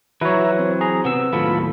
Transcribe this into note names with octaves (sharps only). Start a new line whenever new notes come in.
E3 F#3 F#4 B4 C#5 E5 A#5
C4
G#4 A#5
C3 B3 E6
D#2 A2 F#3 F4 A4 B5